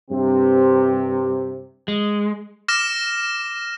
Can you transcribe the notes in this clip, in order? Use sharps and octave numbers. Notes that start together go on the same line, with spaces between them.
G2 C3 C4
G#3
D6 F6 A#6 E7